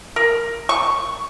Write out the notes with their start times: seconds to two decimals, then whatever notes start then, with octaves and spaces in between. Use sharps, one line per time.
0.16 A#4
0.69 C#6